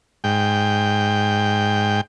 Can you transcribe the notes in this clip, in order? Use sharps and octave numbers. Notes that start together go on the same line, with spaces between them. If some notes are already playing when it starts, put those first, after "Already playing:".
G#2 G5